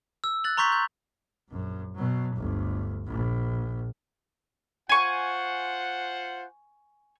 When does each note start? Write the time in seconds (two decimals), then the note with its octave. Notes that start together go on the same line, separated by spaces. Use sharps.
0.24 E6
0.44 F#6 A6 F#7
0.57 A#5 C6 C#6 G6 B6 F7
0.72 G6
1.49 A#1 F#2
1.96 B2 F#3
2.36 G1 D2
3.07 A#1
4.89 F4 C5 F#5 G#5 C#6